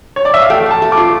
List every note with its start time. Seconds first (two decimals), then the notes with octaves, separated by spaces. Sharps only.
0.16 C#5
0.25 D5
0.34 E5
0.42 F5
0.50 A3 G5
0.66 A3 A5
0.82 A3
0.92 D6
0.97 F4